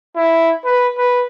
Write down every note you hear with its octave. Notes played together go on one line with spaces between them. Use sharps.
E4
B4
B4